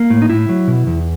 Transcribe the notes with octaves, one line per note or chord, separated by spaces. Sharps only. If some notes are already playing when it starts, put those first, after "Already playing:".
Already playing: A#3
A2
D#4
A2 E4
F#3
B2
E2